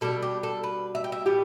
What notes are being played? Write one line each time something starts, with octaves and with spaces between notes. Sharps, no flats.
B2 G3 D4 A4
G4
A4
B4
E5
G5
E5
A2 E3 G3 B3 G4